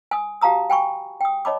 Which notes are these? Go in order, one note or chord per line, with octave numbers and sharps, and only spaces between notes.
G#5 D#6
F#4 G4 F5 A5 A#5 D#6
G5 G#5 B5 C#6
G5 D#6
C#5 D#5 A5 B5 D6